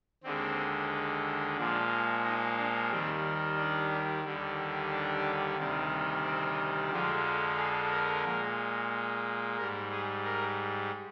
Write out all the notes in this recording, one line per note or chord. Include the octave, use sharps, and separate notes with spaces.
D#2 D3 G#3 C4
A#2 F3 G#3 D4
D#4
D4
D#2 D#3 G3 C4
D4
D#2 D3 G3
D4
D2 C3 D#3 G3
C4
F2 D3 F3 G#3 G4
G#4
A#4
A#2 G#3
G#2 G3 A#4
G#4
A#4